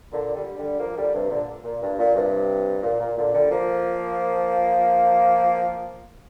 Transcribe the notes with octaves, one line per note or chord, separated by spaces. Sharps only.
A#2 D3
D3 G3
D3 G3
F3 A#3
D3 G3
G2 C3
A#2 D3
A#2
G2
A#2
G2 C3
A#2
A#2
A#2 D3
D3 G3
F3 A#3